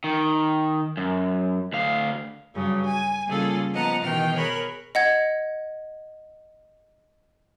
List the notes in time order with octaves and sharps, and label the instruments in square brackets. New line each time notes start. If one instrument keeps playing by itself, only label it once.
[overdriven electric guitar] D#3
F#2
D2 F5
[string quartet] G2 C#3 F#3
G#5
C#3 G3 A#3 F4 G#4 A4
F3 B3 D#5 F#5 A5 A#5
B2 D#3 E3 G5 F6
G#4 A#4 C#5 B5 F#6
[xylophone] D#5 F#5 G#6